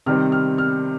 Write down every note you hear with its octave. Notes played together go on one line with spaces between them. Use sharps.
C3 D#3 G3 C4 F6
F6
F6